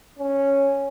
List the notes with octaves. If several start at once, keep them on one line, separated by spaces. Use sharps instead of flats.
C#4